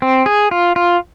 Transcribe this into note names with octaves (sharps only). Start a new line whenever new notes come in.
C4
G#4
F4
F4